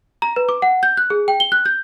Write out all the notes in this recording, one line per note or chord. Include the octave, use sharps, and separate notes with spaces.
A#5
B4
D6
F#5
G6
F#6
G#4
G5
G7
F#6
G6